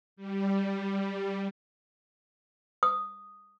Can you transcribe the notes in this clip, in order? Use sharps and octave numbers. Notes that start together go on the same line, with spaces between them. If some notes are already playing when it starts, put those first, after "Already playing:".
G3
D#6